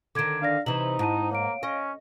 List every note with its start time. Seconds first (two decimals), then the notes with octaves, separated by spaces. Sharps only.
0.15 D3 D#3 D6 G#6 D7
0.42 D4 D5 F5 A#6
0.66 C3 E3 D#4 F#7
0.99 G#2 E4 A5 D#7
1.31 A#3 C#5 F5 D7
1.63 C#4 D#5